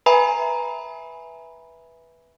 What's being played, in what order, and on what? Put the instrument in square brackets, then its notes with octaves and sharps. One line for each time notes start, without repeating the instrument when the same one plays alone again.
[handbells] B4 E5 G#5 A#5 B5